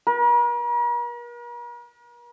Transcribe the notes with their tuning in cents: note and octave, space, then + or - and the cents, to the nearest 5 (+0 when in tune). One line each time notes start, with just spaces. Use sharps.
A#4 +45